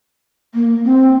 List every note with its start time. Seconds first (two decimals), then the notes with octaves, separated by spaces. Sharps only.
0.55 A#3
0.84 C4